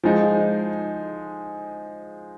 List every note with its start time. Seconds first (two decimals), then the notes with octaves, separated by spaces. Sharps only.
0.04 F3 G#3 D#4